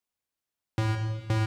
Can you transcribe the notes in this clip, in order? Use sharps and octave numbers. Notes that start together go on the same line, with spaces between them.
A2
A2